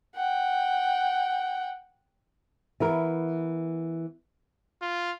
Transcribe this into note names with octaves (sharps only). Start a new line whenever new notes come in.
F#5 G5
E3 B3 A#4
F4